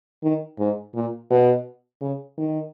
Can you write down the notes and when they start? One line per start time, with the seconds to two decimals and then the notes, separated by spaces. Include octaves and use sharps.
0.23 D#3
0.59 G#2
0.95 A#2
1.30 B2
2.01 C#3
2.38 D#3